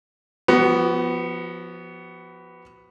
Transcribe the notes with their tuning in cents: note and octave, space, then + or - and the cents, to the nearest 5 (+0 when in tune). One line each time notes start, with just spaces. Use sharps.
F3 +0 B3 +0 F#4 +40